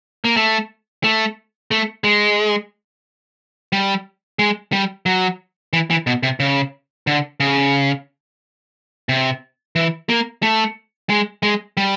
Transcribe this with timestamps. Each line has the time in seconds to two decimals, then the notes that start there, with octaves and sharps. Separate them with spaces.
0.25 A#3
0.36 A3
1.04 A3
1.71 A3
2.04 G#3
3.72 G3
4.39 G#3
4.73 G3
5.06 F#3
5.73 E3
5.90 E3
6.07 B2
6.23 C3
6.40 C#3
7.07 D3
7.40 C#3
9.09 C3
9.76 E3
10.09 A#3
10.43 A3
11.09 G#3
11.43 G#3
11.77 G3